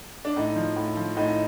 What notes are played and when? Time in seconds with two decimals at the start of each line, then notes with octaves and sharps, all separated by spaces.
0.25 D4
0.36 A2 D#4
0.56 F3
0.76 A2
0.97 F3
1.17 A2 D#4